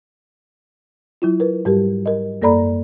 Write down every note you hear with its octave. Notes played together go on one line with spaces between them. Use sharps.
F#3 E4 F4
A#4 B4
G#2 G3 G4 A#4
A#4 D#5
F#2 A#3 A4 D5 A#5 B5